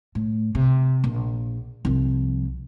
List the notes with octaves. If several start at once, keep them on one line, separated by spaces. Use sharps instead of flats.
A2
C3
A#1
C2 F3